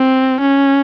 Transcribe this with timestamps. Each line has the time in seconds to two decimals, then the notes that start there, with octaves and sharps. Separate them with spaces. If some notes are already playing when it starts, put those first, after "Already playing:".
Already playing: C4
0.40 C#4